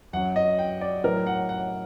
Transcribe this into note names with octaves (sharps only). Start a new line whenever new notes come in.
F#2 F#3 F#5
D#5
G5
D5
A2 F#3 A#4
F#5
F#5